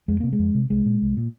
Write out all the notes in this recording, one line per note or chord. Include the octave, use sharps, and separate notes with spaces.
F2 G#3
C3 A#3
G#3
F2
C3
C2 G#3
A#2
C2
A#2